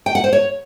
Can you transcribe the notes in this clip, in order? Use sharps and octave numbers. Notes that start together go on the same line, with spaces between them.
G5
F#5
C5
C#5